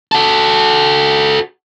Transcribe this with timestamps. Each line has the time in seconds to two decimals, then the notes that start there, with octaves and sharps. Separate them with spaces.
0.12 F#4 A4